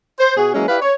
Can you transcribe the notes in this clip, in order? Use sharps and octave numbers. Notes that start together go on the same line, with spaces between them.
C5
B2 F#4 G#4
E3 F#3 G#3 A#3 C#4
E4 G4 B4 D5 F5
C#5